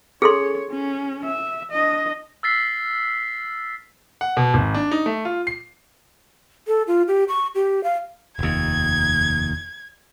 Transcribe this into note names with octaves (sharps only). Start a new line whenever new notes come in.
C#4 G#4 A4 C#5 C6
C#4
E5
D4 D#5
E6 F6 A6 B6 C7
F#5
B2
G#1
D4
D#4
A3
F4
C7
A4
F4
G4
C#6
G4
F5
F1 D#2 G#6